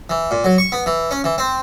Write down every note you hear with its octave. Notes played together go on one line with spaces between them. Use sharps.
E3
A#2
F#3
C#6
B3
E3
C#4
E3
C4